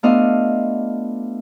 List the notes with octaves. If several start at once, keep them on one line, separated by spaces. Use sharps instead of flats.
A3 B3 D4 F4 D#5 F5